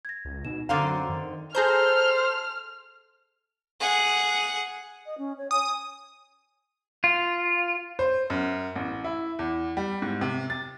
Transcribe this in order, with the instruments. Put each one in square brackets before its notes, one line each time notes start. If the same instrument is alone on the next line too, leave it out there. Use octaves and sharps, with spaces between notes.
[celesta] G#6 A#6
[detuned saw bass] C#2
[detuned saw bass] B2 [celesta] D#4 E7
[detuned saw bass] F#2 [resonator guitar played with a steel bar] D3 C4 F5 [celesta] A#5 D6 A6
[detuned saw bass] D#3
[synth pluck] G#4 A#5 G6 [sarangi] A4 [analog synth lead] C5 [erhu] F6
[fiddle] G#4 F#5
[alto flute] D#5
C#4
C#5
[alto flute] G#5 [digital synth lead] D#6
[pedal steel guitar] F4
[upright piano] C5
F#2
A1
E4
E2
G3
G#2
C3
A6